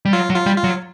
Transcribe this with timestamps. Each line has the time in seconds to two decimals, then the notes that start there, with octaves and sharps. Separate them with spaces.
0.05 G3
0.13 F#3 F4
0.30 F#3
0.35 F4
0.46 G3
0.58 F4
0.64 F#3